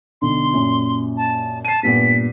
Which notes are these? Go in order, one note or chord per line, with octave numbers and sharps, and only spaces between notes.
B1 D3 C6
F#2 A#2
A5
A5 C7 D#7
G2 A#2 B3 B6